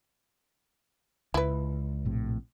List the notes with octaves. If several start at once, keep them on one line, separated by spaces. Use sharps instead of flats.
C#2 E4 B4
A#1 A2 C3